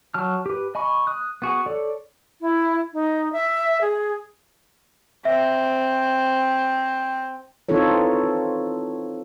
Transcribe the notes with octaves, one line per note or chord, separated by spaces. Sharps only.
F#3 A5 F6
G4 B4
D#5 G#5 B5 C#6
D#6 F#6
B3 F#4 G#4
A4 C#5 D5
E4
D#4
E5
G#4
C4 E5
E3 C4 D#4 F4 A4 C#5